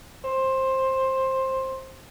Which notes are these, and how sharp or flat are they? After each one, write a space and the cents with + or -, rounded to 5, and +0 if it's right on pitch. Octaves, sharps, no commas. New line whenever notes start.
C5 +15